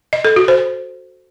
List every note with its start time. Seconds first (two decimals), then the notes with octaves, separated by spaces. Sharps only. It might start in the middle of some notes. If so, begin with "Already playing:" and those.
0.13 D#5
0.25 A4
0.36 F#4
0.48 C5